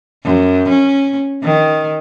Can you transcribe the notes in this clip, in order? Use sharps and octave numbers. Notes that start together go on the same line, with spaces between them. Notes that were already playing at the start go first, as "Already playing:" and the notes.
F#2
C#4
D#3